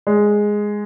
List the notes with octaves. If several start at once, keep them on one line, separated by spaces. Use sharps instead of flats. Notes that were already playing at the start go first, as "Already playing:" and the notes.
G#3